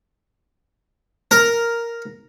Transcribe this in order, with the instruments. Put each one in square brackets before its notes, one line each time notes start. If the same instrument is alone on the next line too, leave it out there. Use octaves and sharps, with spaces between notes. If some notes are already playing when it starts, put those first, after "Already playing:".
[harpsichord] A#4